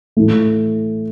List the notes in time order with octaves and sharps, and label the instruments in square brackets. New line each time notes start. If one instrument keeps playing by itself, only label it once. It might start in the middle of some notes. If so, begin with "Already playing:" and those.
[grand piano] A2 E3 A3